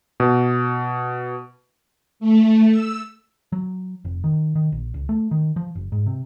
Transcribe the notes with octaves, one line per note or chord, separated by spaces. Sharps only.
B2
A3
E6
F#3
F1
D#3
D#3
A#1
C#2
A3
D#3
F3
F#1
G#2
C3